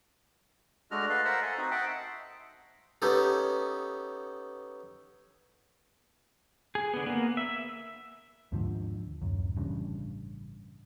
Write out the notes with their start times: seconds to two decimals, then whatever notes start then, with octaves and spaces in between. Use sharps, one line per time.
0.91 G#3 A3 D4 F#4 D#5 F6
1.09 F#4 A4 B4 D#5 F5
1.25 A#4 C5 E5 F#5 E6
1.42 A4 G#5
1.57 C4 D#4 F#4
1.71 D#5 E5 F#5 G5 A5 C6
3.02 B3 C#4 D#4 G4 A4
6.75 G#4
6.94 D3 B3
7.06 A#3 B3
7.37 E5
8.52 D#2 G#2 D3 F3
9.22 D1 F#2
9.57 A1 G2 C#3